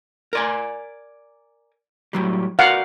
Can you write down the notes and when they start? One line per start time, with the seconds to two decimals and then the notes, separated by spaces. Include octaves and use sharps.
0.33 A#4 D5 G#5
2.13 A2 F#3 G3
2.59 F#4 A#4 D5 F5 F#5